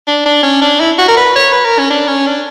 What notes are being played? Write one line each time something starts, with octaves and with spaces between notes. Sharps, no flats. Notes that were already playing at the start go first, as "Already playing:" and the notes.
D4
D4
C#4
D4
E4
F#4
A#4
B4
C#5
B4
A#4
C#4
D4
C#4
D4